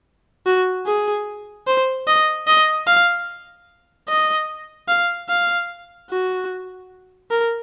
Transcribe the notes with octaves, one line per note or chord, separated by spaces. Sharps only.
F#4
G#4
C5
D#5
D#5
F5
D#5
F5
F5
F#4
A#4